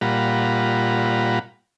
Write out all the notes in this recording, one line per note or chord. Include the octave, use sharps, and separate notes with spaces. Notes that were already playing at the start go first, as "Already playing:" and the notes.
A#2 G3 F4 F#5 A#5 B5